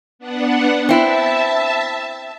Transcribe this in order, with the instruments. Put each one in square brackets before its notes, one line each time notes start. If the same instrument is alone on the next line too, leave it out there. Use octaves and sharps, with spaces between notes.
[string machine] B3 D4 F#5
[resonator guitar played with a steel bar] C4 E4 [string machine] E5 A5